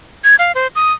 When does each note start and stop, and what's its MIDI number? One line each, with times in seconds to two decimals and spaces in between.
0.24 0.36 92
0.39 0.52 77
0.55 0.67 72
0.75 0.92 87